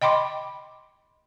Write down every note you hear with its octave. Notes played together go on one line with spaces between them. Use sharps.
D#5 G5 B5 C6 D6